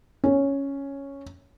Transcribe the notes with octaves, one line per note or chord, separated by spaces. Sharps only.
C#4